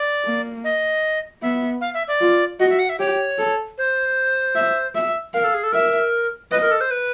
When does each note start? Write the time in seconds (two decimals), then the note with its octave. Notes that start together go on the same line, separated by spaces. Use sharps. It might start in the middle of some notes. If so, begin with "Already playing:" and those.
Already playing: D5
0.25 A#3
0.64 D#5
1.42 B3 E5
1.81 F5
1.94 E5
2.08 D5
2.21 F4
2.59 F#4 D#5
2.70 E5
2.79 F#5
2.89 E5
2.99 G4 C#5
3.38 A4
3.78 C5
4.55 E5
4.95 E5
5.33 A#4 F5
5.44 A4
5.54 G#4
5.64 A4
5.73 A#4 E5
6.51 B4 D#5
6.62 A#4
6.71 A4
6.81 C5
6.91 B4